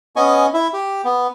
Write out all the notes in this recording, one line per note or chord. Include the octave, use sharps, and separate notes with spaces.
B3 C#4 D#5 G#5 C#6
E4 E5
G4
B3